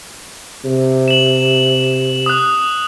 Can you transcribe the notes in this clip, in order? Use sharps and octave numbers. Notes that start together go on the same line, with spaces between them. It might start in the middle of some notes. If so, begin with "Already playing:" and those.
C3
E7 F#7
D#6 F#6